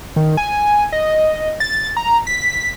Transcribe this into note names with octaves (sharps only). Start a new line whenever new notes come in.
D#3
G#5
D#5
A6
A#5
B6